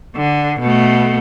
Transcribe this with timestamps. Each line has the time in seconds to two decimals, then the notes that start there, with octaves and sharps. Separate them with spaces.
0.17 D3
0.60 B2 A3